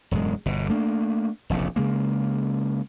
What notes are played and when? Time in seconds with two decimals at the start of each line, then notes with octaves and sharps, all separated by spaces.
0.11 E1 F#2 A2 G#3
0.46 G1 B2
0.69 A3 A#3 D4
1.50 F1 A#1 E2 C#3
1.76 C#3 G#3 A#3